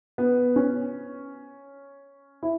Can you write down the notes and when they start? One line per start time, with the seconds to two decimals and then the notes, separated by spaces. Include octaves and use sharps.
0.18 B3
0.56 C#4
2.43 E4